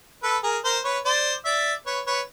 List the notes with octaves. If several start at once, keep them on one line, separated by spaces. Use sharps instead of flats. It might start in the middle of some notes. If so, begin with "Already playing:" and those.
A4 B4
G#4 A#4
A#4 C5
B4 C#5
C5 D5
D5 E5
B4 C#5
B4 C#5